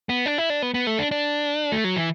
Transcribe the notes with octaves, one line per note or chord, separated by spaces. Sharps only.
B3
D4
E4
D4
B3
B3
A3
D4
D4
A3
F#3
E3